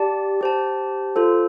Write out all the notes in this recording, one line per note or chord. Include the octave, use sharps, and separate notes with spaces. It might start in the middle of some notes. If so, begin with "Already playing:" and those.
Already playing: G4 D5 A5
G4 C5 A5
F4 A4 C5